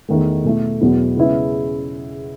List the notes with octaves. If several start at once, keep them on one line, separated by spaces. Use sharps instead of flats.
E2 D#3 A3
B2 A3 E4
E2 B2 F#3 B3 E4
C#3 G#3 B3 E4